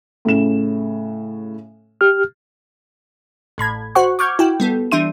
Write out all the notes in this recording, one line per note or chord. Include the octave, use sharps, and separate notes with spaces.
A2 C#3 E7
G4 F6
A1 A2 B5 G#6
F#4 C5 F#5 C#6
C#6 D6 F6 G6 G#6
E4 F#4 G5
G3 B3 A4
E3 G3 D4 E5 C6 D#7